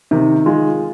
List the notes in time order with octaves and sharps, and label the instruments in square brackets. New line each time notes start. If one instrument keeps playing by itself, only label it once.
[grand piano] C3 [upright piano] D#3
[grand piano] G#3 [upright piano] F4